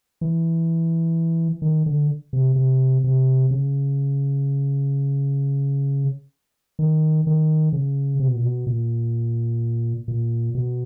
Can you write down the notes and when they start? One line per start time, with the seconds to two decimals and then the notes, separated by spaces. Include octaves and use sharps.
0.21 E3
1.62 D#3
1.86 D3
2.33 C3
2.56 C3
3.04 C3
3.51 C#3
6.79 D#3
7.27 D#3
7.73 C#3
8.20 C3
8.28 B2
8.36 A#2
8.43 B2
8.67 A#2
10.08 A#2
10.55 B2